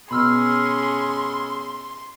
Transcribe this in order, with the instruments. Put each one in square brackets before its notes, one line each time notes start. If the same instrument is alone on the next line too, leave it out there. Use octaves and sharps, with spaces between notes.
[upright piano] B2 [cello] C#4 G#4 [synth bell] B5 E6 F6 [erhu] C6